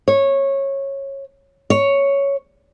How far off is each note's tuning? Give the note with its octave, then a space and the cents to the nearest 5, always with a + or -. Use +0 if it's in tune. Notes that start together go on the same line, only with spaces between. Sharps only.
C#5 -15
C#5 +5